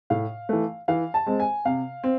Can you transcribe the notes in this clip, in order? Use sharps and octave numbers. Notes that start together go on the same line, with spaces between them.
A2 F5
E3 A3
E3 F5
A5
G#3 C4
G#5
C3 F5
C4